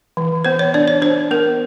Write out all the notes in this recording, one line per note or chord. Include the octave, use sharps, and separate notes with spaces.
E3
B3 C5
C#5
D4 D5
C#5
D4 C5
B3 A#4